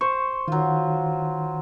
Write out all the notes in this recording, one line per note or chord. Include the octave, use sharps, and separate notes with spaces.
C5 C#6
D#3 F#3 F4